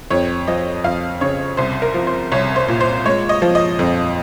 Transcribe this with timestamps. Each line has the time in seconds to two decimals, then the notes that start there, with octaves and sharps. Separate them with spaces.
0.10 F2 C#5
0.47 F3 D#5
0.84 F2 F5
1.21 C#3 C#5
1.57 C2 C5
1.82 A#4
1.94 F3
2.07 C5
2.32 C2 C#5
2.56 C5
2.68 A#2
2.81 C5
3.05 G#3 C#5
3.29 D#5
3.42 F3
3.55 D#5
3.79 F2